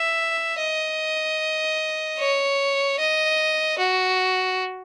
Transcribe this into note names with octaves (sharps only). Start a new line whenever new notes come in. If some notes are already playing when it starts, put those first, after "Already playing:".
Already playing: E5
D#5
C#5
D#5
F#4